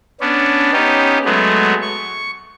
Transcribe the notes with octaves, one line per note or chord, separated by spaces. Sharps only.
B3 C#4 D4
B3 C#4 D#4 G4
F#3 G#3 A3 B3
C#6